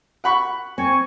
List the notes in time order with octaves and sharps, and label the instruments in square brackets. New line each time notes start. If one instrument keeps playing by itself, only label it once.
[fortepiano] F#5 B5 C#6
[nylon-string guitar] C4 [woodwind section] G#5 C#6